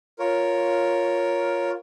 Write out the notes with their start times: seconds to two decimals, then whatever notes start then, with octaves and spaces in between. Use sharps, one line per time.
0.19 F4 A#4 C#5